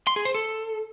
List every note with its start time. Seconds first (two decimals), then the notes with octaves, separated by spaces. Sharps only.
0.07 C6
0.16 G#4
0.25 C5
0.34 A4